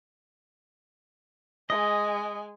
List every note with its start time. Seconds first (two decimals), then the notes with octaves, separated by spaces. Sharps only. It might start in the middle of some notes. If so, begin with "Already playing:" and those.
1.70 G#3 D#5 G#5